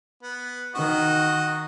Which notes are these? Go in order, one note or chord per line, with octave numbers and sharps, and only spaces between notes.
B3
D#3 F#4 D#5